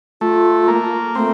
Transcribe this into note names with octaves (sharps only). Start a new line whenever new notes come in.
A3 F4
A#3
A3 C4